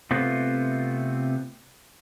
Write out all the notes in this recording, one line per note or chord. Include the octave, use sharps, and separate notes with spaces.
C3 A3 B3 C4 F4